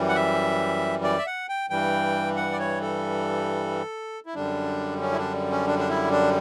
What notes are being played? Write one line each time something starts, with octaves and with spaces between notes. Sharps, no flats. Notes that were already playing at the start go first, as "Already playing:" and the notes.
Already playing: F#2 E3 G3
F#5
E5
D5
E5
F#5
G5
G2 E3 G3 G5
F#5
D5
C#5
A4
E4
F#2 D3 G3 D4
C#4
E4
D4
C#4
D4
D4
E4
D4